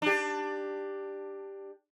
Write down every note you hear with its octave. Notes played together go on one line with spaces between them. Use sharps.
D4 G4